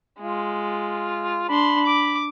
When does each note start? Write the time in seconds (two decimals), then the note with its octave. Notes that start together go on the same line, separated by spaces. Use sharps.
0.21 G#3 F4
1.49 D4 B5 C6
1.86 D6